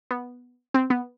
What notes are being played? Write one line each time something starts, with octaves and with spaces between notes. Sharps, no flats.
B3
C4
B3